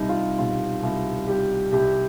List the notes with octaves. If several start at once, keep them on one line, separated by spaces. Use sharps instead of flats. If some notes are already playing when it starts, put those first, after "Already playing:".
Already playing: C2 G3 D#4
F4
B2 F4
C2 F4
G3 G4
C2 G4